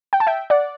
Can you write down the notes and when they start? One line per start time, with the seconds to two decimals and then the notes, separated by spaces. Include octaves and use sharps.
0.13 G5
0.20 A5
0.27 E5 G5
0.50 D5 F#5